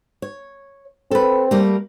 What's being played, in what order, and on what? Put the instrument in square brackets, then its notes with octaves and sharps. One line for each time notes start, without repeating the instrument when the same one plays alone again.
[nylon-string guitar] C#5
[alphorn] C4 [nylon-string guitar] A4 B4
[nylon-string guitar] G3 A3 A#3